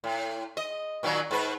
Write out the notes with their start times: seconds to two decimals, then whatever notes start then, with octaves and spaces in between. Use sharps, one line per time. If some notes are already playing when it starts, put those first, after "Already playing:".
0.04 A2
0.57 D#5
1.03 A#2 D#3 F#3
1.31 G#2 B4